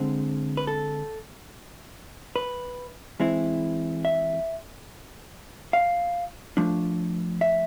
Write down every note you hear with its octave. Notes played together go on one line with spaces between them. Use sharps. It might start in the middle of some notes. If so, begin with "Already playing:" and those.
Already playing: D3 G#3 C4
B4
A4
B4
E3 G#3 C4 E4
E5
F5
F3 A3 D4
E5